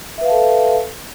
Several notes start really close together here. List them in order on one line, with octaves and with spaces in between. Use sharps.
E5 B4 F5 A5 A4